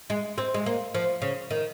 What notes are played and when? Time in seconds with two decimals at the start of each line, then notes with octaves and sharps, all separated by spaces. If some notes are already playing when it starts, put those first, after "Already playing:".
0.10 G#3
0.38 C4
0.54 G#3
0.66 A#3
0.95 F3
1.22 C#3
1.50 D#3